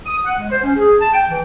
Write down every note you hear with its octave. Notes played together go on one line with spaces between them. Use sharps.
D#6
F#5
G#3
C5
C#4
G#4
A5
G5
E3